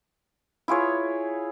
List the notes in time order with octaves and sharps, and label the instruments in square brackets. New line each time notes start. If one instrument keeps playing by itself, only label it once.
[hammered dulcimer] E4 F4 G#4 C#5